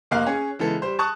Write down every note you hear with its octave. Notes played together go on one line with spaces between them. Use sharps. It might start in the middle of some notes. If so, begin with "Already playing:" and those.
F1 A#3 D#5 F5 F#6
C#4 G#4
C#3 E3 G#3 B3 A4
G3 C5
A5 C#6 D#6 F#6